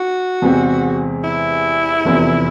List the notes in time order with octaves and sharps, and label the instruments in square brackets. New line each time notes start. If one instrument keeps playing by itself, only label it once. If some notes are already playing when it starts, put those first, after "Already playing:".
Already playing: [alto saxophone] F#4
[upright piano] E2 C3 E3 G#3 C4
[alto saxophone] E4
[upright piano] F1 E2 C3 E3